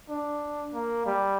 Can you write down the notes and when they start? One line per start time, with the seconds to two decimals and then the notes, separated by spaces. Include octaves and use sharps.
0.09 D4
0.73 A#3
1.06 G3